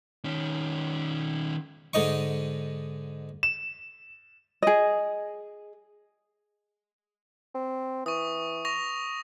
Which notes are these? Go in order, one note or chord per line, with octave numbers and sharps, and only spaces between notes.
D#3 C#4
G#2 D3 D#4 D#5 C#6
E7
G#4 D#5
C4
E3 C#6 D#6
C#6 A#6 F7